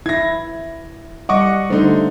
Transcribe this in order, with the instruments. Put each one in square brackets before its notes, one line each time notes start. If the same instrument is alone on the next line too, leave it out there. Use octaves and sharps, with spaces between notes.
[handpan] E4 [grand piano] G#6 A#6
[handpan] G3 F#5 [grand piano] D#5 C#6 D6
[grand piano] D3 D#4 [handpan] G3 A3 C5